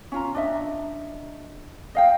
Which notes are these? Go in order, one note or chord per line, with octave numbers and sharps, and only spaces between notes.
C#4 F4 A#5
D4 D#5 E5
D#5 F5 G5